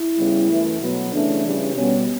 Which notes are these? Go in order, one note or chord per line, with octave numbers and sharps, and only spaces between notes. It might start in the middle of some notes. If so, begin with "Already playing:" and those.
Already playing: E4
C#3 G3 B3
F#2 E3 A3
B2 F#3 B3
C#3 E3 A3 D4
C#3 E3 G3
B2 G3 B3 C#4